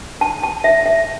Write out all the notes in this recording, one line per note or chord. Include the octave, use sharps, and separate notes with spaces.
A5
A5
E5
E5